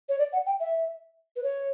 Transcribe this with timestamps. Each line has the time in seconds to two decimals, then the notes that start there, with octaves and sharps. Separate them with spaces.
0.09 C#5
0.19 D5
0.33 F#5
0.46 G5
0.60 E5
1.36 B4
1.43 C#5